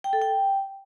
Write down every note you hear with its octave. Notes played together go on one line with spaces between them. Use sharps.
G5
A4
G5